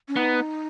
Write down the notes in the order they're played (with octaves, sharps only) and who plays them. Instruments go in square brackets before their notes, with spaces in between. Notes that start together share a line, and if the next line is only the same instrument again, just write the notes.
[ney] C#4
[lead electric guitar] B3 [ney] D#4